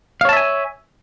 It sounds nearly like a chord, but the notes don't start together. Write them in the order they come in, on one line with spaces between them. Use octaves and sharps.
F5 C#5 A5 E5 G#5